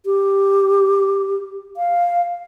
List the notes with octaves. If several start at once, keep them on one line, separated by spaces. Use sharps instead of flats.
G4
F5